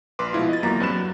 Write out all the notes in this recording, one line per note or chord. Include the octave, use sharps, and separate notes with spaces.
A#1 B4 C6 D6
B2 F3 G#3 E4 F4
D#5 A6
G1 E2 F#3 A#3 A#5 B6
G2 C4 B4 B5 F#6 E7
F#3